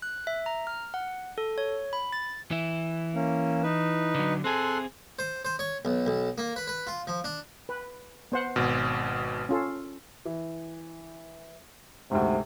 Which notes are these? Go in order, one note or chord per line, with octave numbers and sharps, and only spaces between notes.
F#6
E5
A#5
F6
F#5
A4
C#5
B5
A6
E3 E4
A#3 C#4
D#4 B4
D3 F#3
C4 G#4 A4 C6 F#6
C5
C5
C#5
B1
B1
A#3
B4
B4
F4
F3
D4
B4
B3 C5 F#5
G#1 B2
C#4 F4 A4
E3
D2 G#2 C3